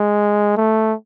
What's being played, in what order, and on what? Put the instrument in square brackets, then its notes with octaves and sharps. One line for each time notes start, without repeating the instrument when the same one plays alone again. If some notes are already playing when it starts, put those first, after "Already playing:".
Already playing: [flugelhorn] G#3
A3